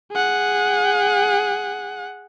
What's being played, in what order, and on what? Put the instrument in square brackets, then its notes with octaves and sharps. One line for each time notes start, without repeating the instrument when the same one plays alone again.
[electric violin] G#4 F#5